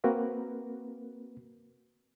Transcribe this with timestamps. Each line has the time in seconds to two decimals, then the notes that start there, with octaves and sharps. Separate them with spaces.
0.04 A#3 C4 F#4 A#4 B4